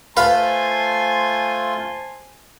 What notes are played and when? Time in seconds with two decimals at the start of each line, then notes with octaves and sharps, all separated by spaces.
0.17 A3 F4 B4 C5 F5 G#5 A5 C6